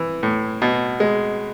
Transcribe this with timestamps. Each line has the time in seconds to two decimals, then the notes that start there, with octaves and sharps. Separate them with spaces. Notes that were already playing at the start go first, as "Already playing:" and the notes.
Already playing: E3
0.23 A2
0.62 B2
1.00 G#3